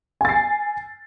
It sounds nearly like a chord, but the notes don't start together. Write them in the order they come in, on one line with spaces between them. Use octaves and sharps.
G#5 A6 C7